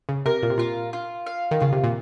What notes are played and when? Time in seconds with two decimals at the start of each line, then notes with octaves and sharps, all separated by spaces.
0.09 C#3
0.26 C3 A#4
0.43 A#2
0.50 C3
0.58 A#2 F4
0.93 F4
1.26 F5
1.51 D#3
1.60 C#3 F4
1.73 C3
1.84 A#2